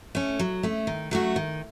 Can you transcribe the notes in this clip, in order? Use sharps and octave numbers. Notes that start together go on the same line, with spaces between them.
A3 C#4
F#3
A3 C#4
D#3
F#3 A3 C#4 F#4
D#3